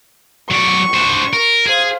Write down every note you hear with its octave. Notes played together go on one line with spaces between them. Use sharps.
F#3 D5 C#6
D4 C5
A#4
G#4 C5 F5